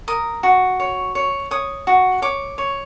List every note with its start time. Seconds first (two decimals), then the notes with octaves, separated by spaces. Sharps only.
0.08 A#4 D#6
0.43 F#4
0.80 C#5
1.15 C#5
1.51 C#5 D#6
1.87 F#4
2.22 C#5 D6
2.58 C#5